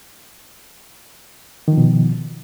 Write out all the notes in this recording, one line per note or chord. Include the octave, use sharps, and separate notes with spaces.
B2 D#3 F3